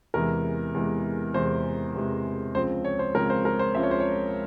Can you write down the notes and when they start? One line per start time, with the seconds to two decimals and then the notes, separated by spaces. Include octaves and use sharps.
0.14 E2 C3 E3 G#3 A#4
0.74 E2 C3 E3 G#3
1.34 E2 C3 E3 G#3 C5
1.94 E2 C3 E3 G#3
2.55 C#2 C#3 F3 C4 C5
2.84 C#5
2.99 C5
3.15 C#2 C#3 F3 C4 A#4
3.30 C5
3.45 A#4
3.59 C5
3.74 C#2 C#3 F3 C4 E5
3.83 C#5
3.91 C5
4.00 C#5